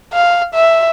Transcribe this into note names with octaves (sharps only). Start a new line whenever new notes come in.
F5
E5